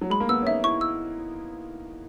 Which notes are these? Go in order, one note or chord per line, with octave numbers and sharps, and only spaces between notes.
F#3
G#3 B5
A#3
B3 E6
C#4
D#4 E5
E4 C#6
E6